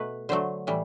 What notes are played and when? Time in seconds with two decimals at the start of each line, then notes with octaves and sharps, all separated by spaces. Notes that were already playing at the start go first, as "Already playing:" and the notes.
Already playing: B2 A3 B4
0.29 D3 F#3 A3 C5
0.67 A2 E3 G3